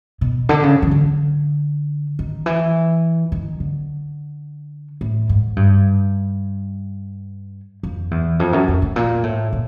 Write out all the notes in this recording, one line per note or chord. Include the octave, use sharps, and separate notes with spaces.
B2
D3
C#3
D#3
D3
D#3
E3
D#3
D3
A2
G#2
G2
F2
E2
F2
F#2
F2
A2
A#2
A2
A#2